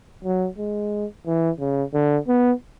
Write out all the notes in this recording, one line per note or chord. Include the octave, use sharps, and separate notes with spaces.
F#3
G#3
E3
C#3
D3
B3